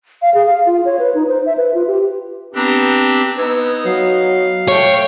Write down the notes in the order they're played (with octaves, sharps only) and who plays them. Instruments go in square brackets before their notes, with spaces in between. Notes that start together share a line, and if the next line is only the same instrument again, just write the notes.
[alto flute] F5
G#4
F5
F4
C#5
B4
D#4
C5
E5
B4
F4
G4
[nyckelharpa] B3 A#5 [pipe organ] C4 D4 G4
[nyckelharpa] B3 D#4 [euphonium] B4 [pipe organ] E6 G#6
[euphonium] F#3 [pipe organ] F5
[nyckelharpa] A3 G5 [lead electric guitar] C#5